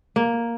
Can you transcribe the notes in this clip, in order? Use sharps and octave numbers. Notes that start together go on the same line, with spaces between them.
A#3